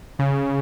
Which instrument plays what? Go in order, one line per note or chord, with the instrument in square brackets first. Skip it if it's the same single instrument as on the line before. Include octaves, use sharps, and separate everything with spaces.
[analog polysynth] C#3